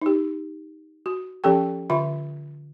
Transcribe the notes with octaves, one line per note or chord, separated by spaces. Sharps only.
D#4 G4
F#4
F3 C#4 G4 A4 G5
D3 F4 E5 B5